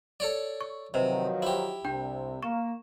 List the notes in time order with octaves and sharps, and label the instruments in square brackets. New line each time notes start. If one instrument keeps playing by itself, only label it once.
[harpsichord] A4 C#5 D5
[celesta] C#6
[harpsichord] C3 [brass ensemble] D#3 F3 F#3 [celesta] B4 C5 D#5
[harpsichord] E4 G4
[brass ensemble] C2 C3 [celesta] D4 G5
[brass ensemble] A#3 [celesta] C#6 E7